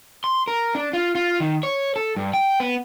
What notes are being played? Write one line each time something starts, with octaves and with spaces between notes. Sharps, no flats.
C6
A#4
D4
F4
F4
D#3
C#5
A4
G2
G5
B3